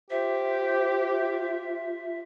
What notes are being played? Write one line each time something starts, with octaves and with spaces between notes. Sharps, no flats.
F4 G4 C5 E5